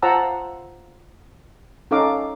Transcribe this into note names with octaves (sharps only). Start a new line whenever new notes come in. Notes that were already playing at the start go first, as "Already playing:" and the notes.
F4 C5 F#5 A5 A#5 E6
C#4 D#4 A4 F5 A#5 D6